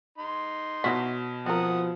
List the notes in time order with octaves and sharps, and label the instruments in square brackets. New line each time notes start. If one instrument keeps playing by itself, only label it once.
[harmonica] D#4 C6
[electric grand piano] B2 B6 [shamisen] F#3 E4 F#4
[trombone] F3 [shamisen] C4 A#4 [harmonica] F#5 D#6